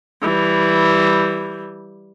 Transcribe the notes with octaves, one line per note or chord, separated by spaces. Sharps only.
E3 G3